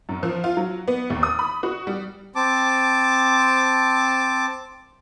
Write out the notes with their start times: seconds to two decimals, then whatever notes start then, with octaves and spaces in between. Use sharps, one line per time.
0.09 F#2
0.23 F3
0.44 F4
0.57 F#3
0.88 B3
1.10 D#2
1.23 D#6
1.39 B5
1.63 F#4
1.87 G3
2.36 C4 A5 D6